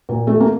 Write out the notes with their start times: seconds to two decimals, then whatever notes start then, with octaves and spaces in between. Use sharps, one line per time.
0.09 A#2
0.27 A3
0.40 A#3